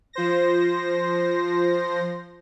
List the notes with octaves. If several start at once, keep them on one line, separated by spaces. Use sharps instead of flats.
F3 C5 A#6